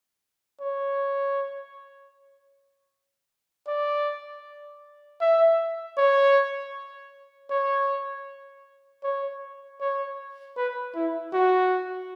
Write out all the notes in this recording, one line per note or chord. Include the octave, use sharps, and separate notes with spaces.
C#5
D5
E5
C#5
C#5
C#5
C#5
B4
E4
F#4